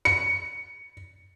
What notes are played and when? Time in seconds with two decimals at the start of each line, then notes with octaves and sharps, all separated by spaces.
0.05 C#7